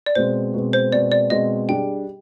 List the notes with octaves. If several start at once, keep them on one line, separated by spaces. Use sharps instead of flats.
D5
B2 G#3 C4 C5
B2 G#3 C4
C5
B2 G#3 C4 D5
D5
B2 G#3 C4 D#5
G3 D4 G#4 G5